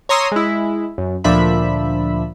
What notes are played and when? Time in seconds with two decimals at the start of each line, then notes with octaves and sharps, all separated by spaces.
0.09 C#5 A#5 C6 D#6 E6
0.32 G#3 E4
0.98 F#2
1.24 D2 A#2 F3 D4 E5 B5